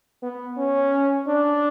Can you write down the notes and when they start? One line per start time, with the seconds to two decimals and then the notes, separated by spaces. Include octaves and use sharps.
0.23 B3
0.57 C#4
1.27 D4